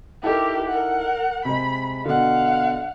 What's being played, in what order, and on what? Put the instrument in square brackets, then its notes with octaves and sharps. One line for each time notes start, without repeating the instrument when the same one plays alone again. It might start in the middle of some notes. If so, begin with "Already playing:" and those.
[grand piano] D#4 E4 A4 [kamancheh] G4 A#4
[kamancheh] A#4 F#5
[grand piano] C3 G#3 [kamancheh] B5
[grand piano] B2 D3 [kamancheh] F5 F#5